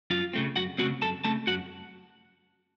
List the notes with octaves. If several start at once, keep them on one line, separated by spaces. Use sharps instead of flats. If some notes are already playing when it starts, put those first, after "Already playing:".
F#2 F4 F5
C#3 A3 C4
F#2 F#4 F#5
C#3 A3 C4 F#4 F#5
F#2 A4 A5
C#3 A3 C4 A4 A5
F#2 F#4 F#5